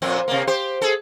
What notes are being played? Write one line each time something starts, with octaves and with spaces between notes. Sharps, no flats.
F2 A#2 C4
C3 A#3
G4 C5
G#4 A4